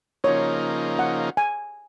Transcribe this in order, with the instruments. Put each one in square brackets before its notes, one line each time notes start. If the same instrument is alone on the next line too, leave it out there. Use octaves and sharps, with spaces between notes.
[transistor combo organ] C#3 F3 A#3 D#4 [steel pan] C#5
[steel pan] F#5
G#5